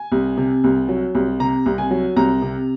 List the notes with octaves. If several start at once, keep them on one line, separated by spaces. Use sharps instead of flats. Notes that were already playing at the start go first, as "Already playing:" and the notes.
Already playing: G#5
C2
C3
C2
F#3
C2
C3 A#5
C2
G#5
F#3
C2 A#5
C3